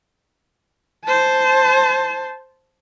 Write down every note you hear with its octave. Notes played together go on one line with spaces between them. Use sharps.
C5 A5